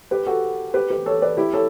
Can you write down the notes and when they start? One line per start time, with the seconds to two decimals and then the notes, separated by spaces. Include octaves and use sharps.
0.11 G4 B4
0.26 F#4 A4
0.74 G4 B4
0.90 G4 B4
1.06 A4 C#5
1.22 B4 D5
1.37 E4 G4
1.53 A4 C#5